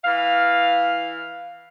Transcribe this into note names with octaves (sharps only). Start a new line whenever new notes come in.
E3 F5